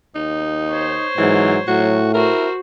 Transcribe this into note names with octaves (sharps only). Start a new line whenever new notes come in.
D#2 D#4
C5 C#5
G#2 E3 F#3
A2 F#3 F#4
E4 F#4 A#4 C5